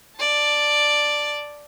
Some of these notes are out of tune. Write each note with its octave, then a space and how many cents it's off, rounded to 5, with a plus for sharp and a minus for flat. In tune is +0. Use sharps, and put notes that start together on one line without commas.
D5 +5 A5 +0